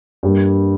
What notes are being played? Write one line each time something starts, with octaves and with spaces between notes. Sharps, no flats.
G2 G3 A#3